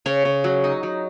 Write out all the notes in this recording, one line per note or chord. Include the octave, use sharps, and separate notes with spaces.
C#3 C#5
C#3
F#3
D#4
F#3